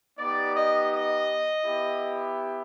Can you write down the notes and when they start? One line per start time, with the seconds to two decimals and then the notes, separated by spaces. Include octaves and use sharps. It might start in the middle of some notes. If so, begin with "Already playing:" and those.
0.18 B3 D#4 G4 D5
0.55 D#5
0.91 D#5
1.64 B3 E4 G4